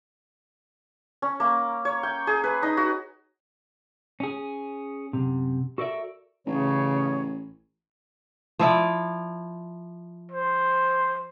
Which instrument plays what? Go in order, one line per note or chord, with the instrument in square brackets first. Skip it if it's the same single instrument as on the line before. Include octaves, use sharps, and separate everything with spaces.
[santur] C#4
A#3
C#5
G5
G#4
B4
D#4
F#4
[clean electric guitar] C#4 G#4
F#2 C3
F#4 A4 A#4 D5 E5
[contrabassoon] A1 [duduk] C#3 [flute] C#5
[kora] F3 E4 D5
[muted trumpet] C5